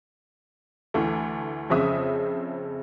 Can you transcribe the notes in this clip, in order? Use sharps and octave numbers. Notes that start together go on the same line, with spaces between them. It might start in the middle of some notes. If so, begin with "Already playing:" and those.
D2 E3 A3
F2 C#3 C4 E5 D#6